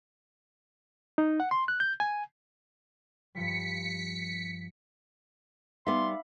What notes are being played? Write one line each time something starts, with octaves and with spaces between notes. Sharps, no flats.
D#4
F#5
C6
F#6
G6
G#5
G2 F3 G3 B6 C#7
G3 B3 D#4 E5 F5 B5 C6 D6